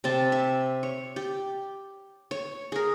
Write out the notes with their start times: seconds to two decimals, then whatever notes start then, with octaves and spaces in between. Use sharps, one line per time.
0.04 C3 C4 A5
0.32 E5
0.83 C#5
1.16 G4
2.31 C#5
2.72 G#4 A#4